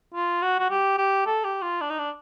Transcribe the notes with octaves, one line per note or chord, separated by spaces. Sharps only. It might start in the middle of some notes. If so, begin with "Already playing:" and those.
F4
F#4
F#4
G4
G4
A4
G4
F4
D4
D#4
D4